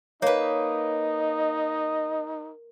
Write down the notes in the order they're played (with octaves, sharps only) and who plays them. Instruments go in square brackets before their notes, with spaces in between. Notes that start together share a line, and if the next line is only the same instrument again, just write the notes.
[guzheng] A#3 B4 [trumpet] D#4 [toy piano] C#5 [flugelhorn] D#5